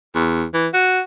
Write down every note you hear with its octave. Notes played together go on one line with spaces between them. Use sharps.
E2
E3
F#4